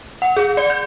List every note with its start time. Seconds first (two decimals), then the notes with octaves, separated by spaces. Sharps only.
0.22 F#5
0.37 G#4
0.57 D5
0.70 G6